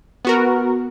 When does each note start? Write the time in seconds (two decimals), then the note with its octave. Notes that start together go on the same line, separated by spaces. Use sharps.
0.25 B3 F#4 A#4